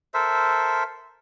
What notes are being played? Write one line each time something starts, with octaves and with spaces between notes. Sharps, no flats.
A4 A#4 C5 E5